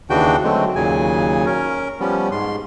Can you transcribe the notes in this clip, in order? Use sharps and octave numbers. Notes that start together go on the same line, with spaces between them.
D#2 C#3 E3 D4 F#4 G5
D3 F#3 G#3 A3 C4
D#2 A#2 C#3 F#3 G#5
C#4 A#4
F3 G3 B3 C#4
G#2 C6